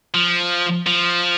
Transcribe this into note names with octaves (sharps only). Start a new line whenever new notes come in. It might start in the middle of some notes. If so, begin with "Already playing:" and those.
F3
F3